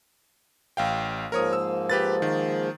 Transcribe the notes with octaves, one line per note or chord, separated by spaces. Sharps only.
A1 F5 G5
G#2 F3 A#3 A#4 C#5 D#6
E6
G4 B4 A6
D#3